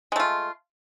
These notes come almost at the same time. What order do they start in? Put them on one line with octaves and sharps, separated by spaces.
G#3 A3 F4